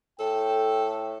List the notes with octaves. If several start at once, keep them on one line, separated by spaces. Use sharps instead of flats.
A2 A4 G5